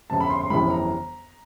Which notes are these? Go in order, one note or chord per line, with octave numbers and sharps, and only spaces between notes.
G1 F2 C#3 A5
B5
C6
C6
G1 F2 C#3 E3 G3 B5
A#5